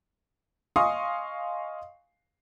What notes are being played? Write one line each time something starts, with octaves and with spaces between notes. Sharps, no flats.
D#5 F5 G#5 C6 C#6 D#6